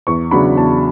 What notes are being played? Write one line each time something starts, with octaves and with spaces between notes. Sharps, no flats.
E2 C#6
C#3 F#3 B3 D4 B5
E2 A5